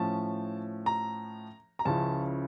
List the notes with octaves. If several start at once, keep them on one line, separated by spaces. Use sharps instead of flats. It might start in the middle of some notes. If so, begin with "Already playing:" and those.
Already playing: A2 F3 C#4 A5
A#5
A#5
C#2 C#3 F3 C#4 E4 A5